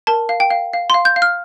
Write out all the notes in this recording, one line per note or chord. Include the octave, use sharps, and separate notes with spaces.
A#4 A5
F5
G5
F5
F5
F5 C6
G6
F5
F6